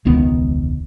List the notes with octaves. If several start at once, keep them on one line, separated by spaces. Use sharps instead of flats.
E1 C#2 D#3 B3